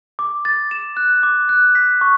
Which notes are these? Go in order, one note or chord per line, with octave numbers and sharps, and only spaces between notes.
D6
A6
E7
F#6
D6
F#6
B6
C#6